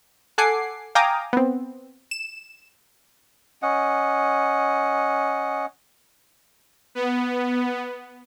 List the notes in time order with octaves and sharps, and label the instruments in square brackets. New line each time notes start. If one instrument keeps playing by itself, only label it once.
[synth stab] A4 F#5 G#5 D6 C7
F5 G5 G#5 A#5 D6 D#6
B3 C4
E7
[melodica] C#4 D#5 F#5
[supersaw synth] B3